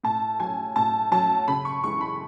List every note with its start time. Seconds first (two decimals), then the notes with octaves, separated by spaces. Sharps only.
0.04 A2 A5
0.40 F#3 C#4 G#5
0.76 A2 A5
1.12 F#3 C#4 A5
1.48 C#3 B5
1.65 C#6
1.84 E3 G#3 C#6
2.01 B5